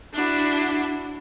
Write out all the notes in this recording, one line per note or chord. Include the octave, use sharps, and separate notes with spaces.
D4 E4 F#4